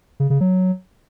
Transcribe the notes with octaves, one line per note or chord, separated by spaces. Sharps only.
C#3
C#3
F#3